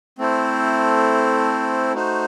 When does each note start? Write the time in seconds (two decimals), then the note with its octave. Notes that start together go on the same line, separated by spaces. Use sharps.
0.18 A3 C4 E4 A4 C5
1.94 A3 D#4 F#4 C5